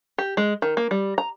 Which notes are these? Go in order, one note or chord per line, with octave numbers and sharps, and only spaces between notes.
G4
G#3
D#3
A#3
G3
A#5